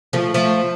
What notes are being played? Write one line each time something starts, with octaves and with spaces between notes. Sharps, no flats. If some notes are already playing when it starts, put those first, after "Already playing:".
F3 A3
F3 A3